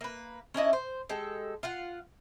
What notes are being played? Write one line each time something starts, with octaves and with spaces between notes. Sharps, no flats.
A#3 B4
C#4 D4 E4 D#5
C5
G#3 G4 A4
F4 F5 F#5